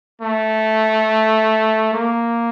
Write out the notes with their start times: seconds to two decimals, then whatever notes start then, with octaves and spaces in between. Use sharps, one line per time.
0.22 A3
1.94 A#3